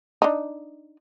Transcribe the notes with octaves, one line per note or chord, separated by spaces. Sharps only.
D4 D#4